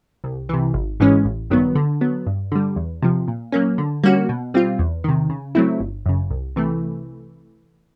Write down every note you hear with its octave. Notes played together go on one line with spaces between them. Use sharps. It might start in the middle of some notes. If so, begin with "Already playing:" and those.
C2
C3 E3
G#1
G#2 E3 G#3 C#4
A1
G2 D#3 F#3 B3
D3
F#3 B3
G2
D3 G3
E2
C3 F3
A#2
F#3 A#3 C#4
D3
G3 A#3 C#4 F#4
B2
G3 C4 F4
E2
C3 D#3
C#3
F#3 A3 C4 E4
G1
F#2 C#3
C2
C3 E3 A3